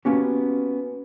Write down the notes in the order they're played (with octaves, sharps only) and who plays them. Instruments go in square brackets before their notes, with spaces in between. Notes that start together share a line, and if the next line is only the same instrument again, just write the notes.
[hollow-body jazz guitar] A#3 B3 C#4 F#4 G4